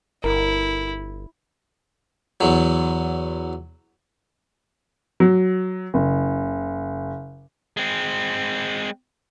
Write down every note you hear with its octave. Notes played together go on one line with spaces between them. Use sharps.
G1 E4 A#4
E2 F#3
F#3
F#1
G#3 C4